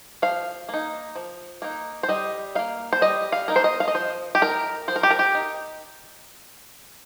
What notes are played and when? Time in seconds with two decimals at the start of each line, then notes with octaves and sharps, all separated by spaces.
0.22 F3 F5
0.69 A#3 D#4
1.16 F3
1.62 A#3 D#4
2.03 C5
2.09 G3 D#5
2.55 A#3 D#4 F5
2.93 C5
3.02 G3 D#5
3.32 F5
3.48 A#3 D#4 A#4
3.56 C5
3.64 D#5
3.80 F5
3.88 D#5
3.95 F3 C5
4.35 G4
4.42 D#4 A#4
4.88 F3 C5
4.96 A#4
5.03 G4
5.10 A#4
5.19 G4
5.35 D#4